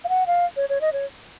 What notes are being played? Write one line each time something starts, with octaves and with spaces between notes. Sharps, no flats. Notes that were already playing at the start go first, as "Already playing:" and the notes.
F5
F#5
F5
C#5
C#5
D#5
C#5